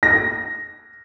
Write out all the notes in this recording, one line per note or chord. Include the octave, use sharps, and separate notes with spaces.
A#6